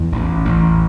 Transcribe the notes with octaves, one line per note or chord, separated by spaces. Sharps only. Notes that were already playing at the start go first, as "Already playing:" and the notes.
Already playing: E2 E3
A1
A1